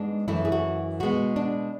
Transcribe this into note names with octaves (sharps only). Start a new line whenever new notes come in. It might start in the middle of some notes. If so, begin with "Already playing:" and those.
Already playing: G#2 G#3 B3 D4
F#2 E3 A3 E4
G#4
F#4
B2 G#3 B3 F#4
D4